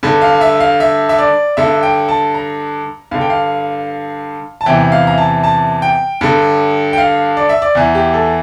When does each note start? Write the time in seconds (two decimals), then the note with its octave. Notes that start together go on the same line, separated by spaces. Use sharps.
0.03 G2 D3
0.22 F5
0.41 E5
0.60 F5
0.80 E5
1.09 E5
1.18 D5
1.57 G2 D3 E5
1.83 G5
2.08 A5
2.34 A#5
3.11 G2 D3 F5
3.21 G5
3.30 F5
4.61 A5
4.66 E2 C3 E3 G5
4.92 F5
5.07 A#5
5.18 A5
5.44 A5
5.82 G5
6.21 G2 D3
6.93 G5
6.98 F5
7.37 D5
7.49 E5
7.62 D5
7.75 E2 E3
7.95 G4
8.14 A4